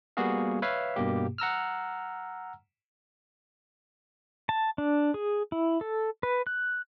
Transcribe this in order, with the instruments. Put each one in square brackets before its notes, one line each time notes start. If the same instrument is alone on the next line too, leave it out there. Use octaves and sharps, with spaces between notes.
[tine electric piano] G3 A#3 B3 F#4 G#4 F5
B4 C#5 E5 F5
G2 B2 A#3 G4
F#5 A#5 E6 F6
[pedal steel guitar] A5
D4
G#4
E4
A4
B4
F#6